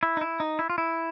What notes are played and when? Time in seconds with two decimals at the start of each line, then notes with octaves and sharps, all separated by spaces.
0.03 E4
0.17 D#4
0.21 E4
0.40 D#4
0.59 E4
0.70 F4
0.78 E4